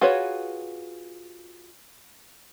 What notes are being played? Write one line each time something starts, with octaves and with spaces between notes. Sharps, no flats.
F4 F#4 G#4 B4 C#5